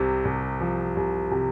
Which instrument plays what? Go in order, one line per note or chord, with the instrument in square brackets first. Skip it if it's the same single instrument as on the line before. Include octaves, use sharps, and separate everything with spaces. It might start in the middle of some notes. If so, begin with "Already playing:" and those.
Already playing: [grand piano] C2 C3
C2
F3
C2
C3